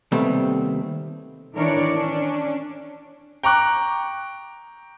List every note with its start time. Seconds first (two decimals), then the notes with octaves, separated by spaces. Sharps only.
0.12 D#2 C3 G3 A3 B3 C4
1.53 D#3 E3 D4 A#4 C#5 D5
1.94 C#4 D4
3.43 G5 A#5 C#6 D6 F#6